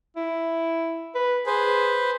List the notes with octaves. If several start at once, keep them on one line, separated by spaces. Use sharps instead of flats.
E4
B4
G#4 B4 C5